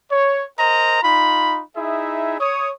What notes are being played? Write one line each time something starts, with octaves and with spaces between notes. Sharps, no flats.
C#5
A#4 C5 D#5 A#5
D#4 F4 B5
D#4 E4 G#4 E5
C#5 D#6